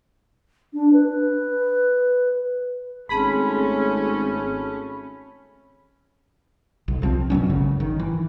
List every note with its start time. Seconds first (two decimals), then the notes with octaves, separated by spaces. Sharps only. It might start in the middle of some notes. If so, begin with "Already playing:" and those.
0.74 D4
0.93 B4
3.09 G#1 A3 C4 C#4 G#4 A5 B5
6.88 B1
7.02 C2 F3 G#3 C4
7.30 F#2 B2 F#3 C#4
7.50 G#1 C#3
7.80 D#3
8.00 E3